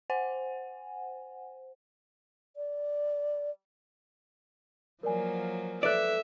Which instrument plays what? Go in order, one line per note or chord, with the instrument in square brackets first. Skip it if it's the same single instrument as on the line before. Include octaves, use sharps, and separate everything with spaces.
[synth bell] C5 F#5 G#5
[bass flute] D5
[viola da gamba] F3 F#3 A#3 [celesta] A#4 D5 G#5
[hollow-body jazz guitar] A4 D5 [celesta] B4 F#6 [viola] E5